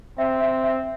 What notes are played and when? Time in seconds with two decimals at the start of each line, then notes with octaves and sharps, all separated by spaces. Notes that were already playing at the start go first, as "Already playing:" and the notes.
0.18 C4 E5
0.40 E5
0.64 E5